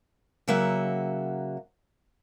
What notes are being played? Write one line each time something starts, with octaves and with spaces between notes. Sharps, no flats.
C#3 F#3 A#3 E5 F#5